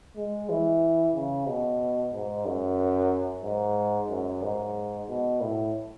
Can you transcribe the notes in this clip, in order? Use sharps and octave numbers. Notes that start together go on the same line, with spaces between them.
G#3
E3
C#3
B2
G#2
F#2
G#2
F#2
G#2
B2
A2